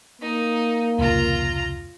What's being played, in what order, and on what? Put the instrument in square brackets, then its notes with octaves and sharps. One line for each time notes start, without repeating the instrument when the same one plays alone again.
[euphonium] A#3 [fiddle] D#4
[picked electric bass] F1 C#2 A#2 [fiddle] F4 A#5